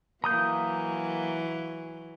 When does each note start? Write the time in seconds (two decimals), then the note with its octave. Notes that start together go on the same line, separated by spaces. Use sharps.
0.24 E3 F#3 A#3 A#5 D#6 G6